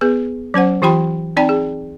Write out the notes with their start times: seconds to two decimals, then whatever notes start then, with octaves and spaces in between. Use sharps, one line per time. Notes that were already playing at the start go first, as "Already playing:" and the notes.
0.01 B3 G#4 B4
0.54 F#3 C#4 C5 F#5
0.82 E3 F4 G4 G5 B5 C6
1.37 C4 D#4 D5 G5 A5 B5
1.49 G#4